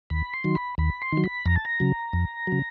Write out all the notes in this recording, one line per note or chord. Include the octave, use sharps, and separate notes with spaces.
D#2 B5
C6
D#3 F#3
B5
D#2 B5
C6
D#3
F#3
B5
F2 A#5
A5
A#5
C#3 F#3
F2
C#3 F#3